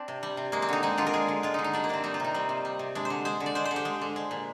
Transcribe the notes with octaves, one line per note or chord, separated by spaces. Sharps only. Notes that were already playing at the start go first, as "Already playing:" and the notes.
Already playing: C4 D4
C3
G3
C3
G#3 A#3
C4
D3 D#4
G#3 D#4
D3 F4
A#4
G#3 G#4
D3
G#3 F4
D3 D#4
D#4
G3 D4
A#3
C3 C4 D4
G3 D#4
F4
C3 D#4
G3 C4
C3
G3
C3
G#3 D4
C5
D3
G#3 C5
D3
D5
G#3 C5
C5
D3
G4
G#3
D3
G#3
A#2